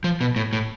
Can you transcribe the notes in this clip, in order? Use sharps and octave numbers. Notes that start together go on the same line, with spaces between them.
F3
B2
A2
A2